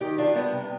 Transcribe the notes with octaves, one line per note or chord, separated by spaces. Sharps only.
D#3 D#4 G4
C3 D4 F4
G3 B3 D4
C3